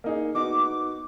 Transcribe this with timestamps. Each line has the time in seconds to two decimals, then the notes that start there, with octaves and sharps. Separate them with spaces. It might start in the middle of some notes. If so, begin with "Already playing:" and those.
0.04 A#3 D#4 G#4
0.35 B3 D#4 F#4 D6